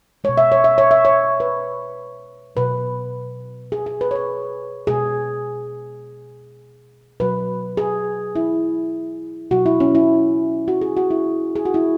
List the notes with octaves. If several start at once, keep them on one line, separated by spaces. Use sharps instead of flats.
B2 G#3 C#5
E5
C#5
E5
C#5
E5
C#5
B4
B2 F#3 B4
G#4
G#4
B4
C#5
B4
B2 G#3 G#4
B2 F#3 B4
G#4
E4
B2 F#3 F#4
E4
C#4
E4
F#4
G#4
F#4
E4
G#4
F#4
E4